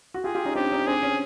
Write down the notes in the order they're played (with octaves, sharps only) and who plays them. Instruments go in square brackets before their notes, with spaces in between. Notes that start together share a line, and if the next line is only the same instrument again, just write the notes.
[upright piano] F#4
[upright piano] F4 G4 [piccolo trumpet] G#4
[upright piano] F4 G4
C#4 D#4
[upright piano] C4 D4 [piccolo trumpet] G4
[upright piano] C#4 D#4
[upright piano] C4 D4 [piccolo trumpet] G#4
[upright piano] C#4